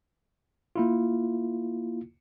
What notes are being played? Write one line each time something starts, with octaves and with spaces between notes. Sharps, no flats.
A#3 E4 F4